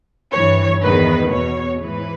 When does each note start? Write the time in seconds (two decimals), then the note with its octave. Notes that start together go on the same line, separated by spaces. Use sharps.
0.32 G2 E3 C#5
0.83 E2 D#3 B4
1.31 E2 B2 C#5
1.82 G#2 E3 B4